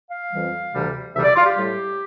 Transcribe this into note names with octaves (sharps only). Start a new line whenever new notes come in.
F5
F2 E3 G3
D2 C3 E3 G3
D2 C3 E3 G3 E5
D5
F4
G4
A2 G3